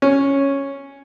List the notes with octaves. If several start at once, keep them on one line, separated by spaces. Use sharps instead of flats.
C#4